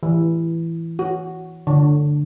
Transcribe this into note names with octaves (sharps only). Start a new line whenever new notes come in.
E3
F#4
D3